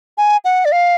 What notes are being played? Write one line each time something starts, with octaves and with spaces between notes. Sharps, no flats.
G#5
F#5
D5
F5